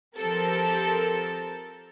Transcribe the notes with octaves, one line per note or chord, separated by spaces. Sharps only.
F3 C4 G4 A4 A#4